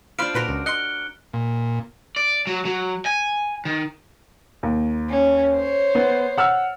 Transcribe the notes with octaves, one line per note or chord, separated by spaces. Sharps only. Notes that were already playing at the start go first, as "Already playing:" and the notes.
D4 F4 C5 F5 B5 C6 F6 D7
A#2 F#4 A#4 B4 C6
C#2
D#5 C6 F#6 C#7 G7
A#2
D5
F#3
F#3
G#5
D#3
D#2
C#4
C5 C#5
B3
F#5 E6 F6